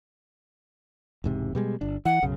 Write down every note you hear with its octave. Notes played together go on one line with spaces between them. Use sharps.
E1 G#2 C3
B2 G3 G#3
G1 D4
E3 F#5
B1 F#2 C#3